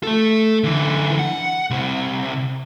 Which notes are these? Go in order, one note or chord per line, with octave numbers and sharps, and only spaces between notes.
A3 A4
D3 E3
F#5
C2 C3